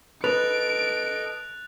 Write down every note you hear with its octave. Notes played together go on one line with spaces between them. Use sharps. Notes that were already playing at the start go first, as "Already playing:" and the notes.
A4 B4 D#5 F#6 A6 D7 F7